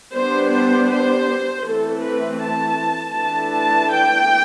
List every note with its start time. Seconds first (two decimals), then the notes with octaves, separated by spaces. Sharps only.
0.13 G3 B3 D4 C5
0.52 C5
0.90 C5
1.65 E3 A3 C4 A4
2.04 B4
2.42 A5
3.16 E3 A3 D4 A5
3.55 A5
3.92 G5